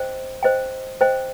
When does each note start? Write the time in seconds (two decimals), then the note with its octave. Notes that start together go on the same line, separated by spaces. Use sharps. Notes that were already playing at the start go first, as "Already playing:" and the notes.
Already playing: C5 D#5 G5
0.43 C5 D#5 G5
1.01 C5 D#5 G5